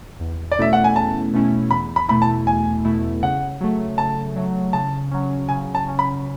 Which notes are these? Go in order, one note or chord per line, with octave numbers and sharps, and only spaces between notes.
E2
D5
B2 A3 C#4 E4 E5
F#5
G#5
E2 A5
B2 A3 C#4 E4
E2 B5
B5
B2 A3 E4 B5
A5
E2 G#5
B2 A3 E4
C#3 F#5
F#3 A3
C#3 A5
F#3 A3
C#3 A5
F#3 C#4
C#3 G#5
A5
F#3 C#4
B5